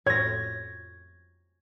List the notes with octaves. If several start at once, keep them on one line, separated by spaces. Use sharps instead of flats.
F2 A2 C#5 G#6 A#6